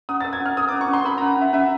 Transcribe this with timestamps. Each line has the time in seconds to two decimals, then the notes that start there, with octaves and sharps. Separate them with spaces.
0.09 C#4 D#6
0.21 A#4 A6
0.33 G#6
0.41 C#4
0.46 F6
0.57 A#4 D#6
0.69 C#4 D6
0.81 C#6
0.89 C#4 C6
1.05 A#4 B5
1.18 C#4 A#5
1.37 C#4 E5
1.53 C#4 E5